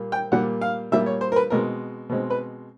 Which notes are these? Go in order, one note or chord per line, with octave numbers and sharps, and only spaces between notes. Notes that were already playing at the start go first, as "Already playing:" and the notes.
Already playing: A#2 G3 A#3
G5
A#2 G3 A#3 F#5
F5
A#2 G3 A#3 E5
C#5
C5
A#4
B4
B2 G#3 C4 A#4
B2 G#3 C4
B4